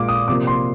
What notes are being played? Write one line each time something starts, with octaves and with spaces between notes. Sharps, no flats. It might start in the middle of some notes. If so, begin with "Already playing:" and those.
Already playing: A#2 G#3 D6
D#6
C3 F3 A#3 D6
C6